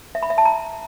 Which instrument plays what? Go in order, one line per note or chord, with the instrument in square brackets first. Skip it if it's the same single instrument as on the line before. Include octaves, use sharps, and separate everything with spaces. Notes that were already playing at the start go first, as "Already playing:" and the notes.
[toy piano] E5
B5
E5
A5
A#5